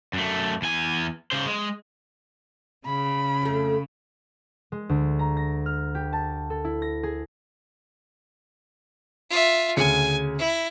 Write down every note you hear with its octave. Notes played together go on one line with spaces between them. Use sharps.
F#2 A3
E2 G#5
C#3 C5
G#3
C#3 B5
F2 A3
G#3
D2
A#5
A#6
F6
G4
A5
A4
E4
A#6
G#4
F4 E5
D2 C#3 G#5 C#7
E4